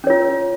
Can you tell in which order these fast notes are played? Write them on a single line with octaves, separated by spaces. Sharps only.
C#4 C#5 F4